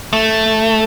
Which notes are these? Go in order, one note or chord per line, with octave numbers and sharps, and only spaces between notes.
A3